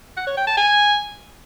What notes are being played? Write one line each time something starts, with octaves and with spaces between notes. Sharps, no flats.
F#5
C#5
G5
A5
G#5